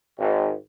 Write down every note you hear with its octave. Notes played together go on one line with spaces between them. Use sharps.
G#1